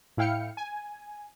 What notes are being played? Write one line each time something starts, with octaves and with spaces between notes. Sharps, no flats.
A2 E4 F5 G5 F6 C#7
G#5